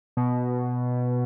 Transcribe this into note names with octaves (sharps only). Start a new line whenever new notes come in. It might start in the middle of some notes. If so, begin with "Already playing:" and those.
B2